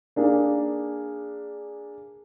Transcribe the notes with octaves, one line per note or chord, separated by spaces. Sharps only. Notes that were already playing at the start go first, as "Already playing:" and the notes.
A#3 D4 G#4